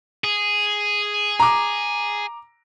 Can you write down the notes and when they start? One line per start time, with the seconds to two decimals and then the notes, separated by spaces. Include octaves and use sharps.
0.24 G#4
1.40 A#5 D6